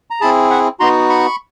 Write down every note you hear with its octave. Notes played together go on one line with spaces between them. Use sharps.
A#5
C4 E4 G#4 A5 B5
E5 F#5
B3 D#4 F#4 A#5 C6
B5 C#6